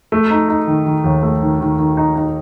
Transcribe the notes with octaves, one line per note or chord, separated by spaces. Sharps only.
A3
D#4
D#4
D#3
D#3
D#2
A3
D#3
D#3
D#3
D#4
D#4